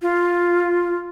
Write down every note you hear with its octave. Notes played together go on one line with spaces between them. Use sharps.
F4